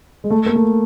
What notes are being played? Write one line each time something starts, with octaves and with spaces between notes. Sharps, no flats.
G#3
A3
A#3
A3